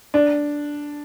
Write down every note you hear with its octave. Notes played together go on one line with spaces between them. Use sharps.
D4